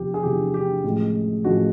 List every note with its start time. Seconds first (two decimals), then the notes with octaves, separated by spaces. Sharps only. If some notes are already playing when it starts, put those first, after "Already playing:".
Already playing: E2 C3 F3 G4
0.14 G#4
0.23 E2 C3 F3 G4
0.54 G4
0.84 A1 A2 F3 G#3
1.44 A1 A2 F3 G#3 F#4